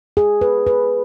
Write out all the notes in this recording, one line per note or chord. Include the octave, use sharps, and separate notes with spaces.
G#4
B4
B4